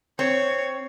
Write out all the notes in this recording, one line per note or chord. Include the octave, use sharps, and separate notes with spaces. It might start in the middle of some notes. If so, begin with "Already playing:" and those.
C4 C#5